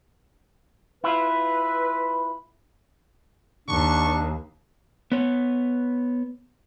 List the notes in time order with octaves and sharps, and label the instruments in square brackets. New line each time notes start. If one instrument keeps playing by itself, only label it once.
[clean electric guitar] E4 F4 [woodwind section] B4
[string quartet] D#2 [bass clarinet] D4 [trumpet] C#6
[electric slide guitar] B3 C#5